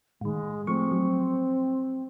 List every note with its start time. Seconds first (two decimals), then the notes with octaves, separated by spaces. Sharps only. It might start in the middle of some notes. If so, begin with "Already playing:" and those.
0.21 A2 D#3 G#3
0.67 F3 A3 C4 C#6
0.92 F#3